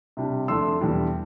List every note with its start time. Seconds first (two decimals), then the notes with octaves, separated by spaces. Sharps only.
0.17 C3 G3 D4
0.48 F2 D3 A3 D4 C6 E6
0.80 E2 D3 G3 D4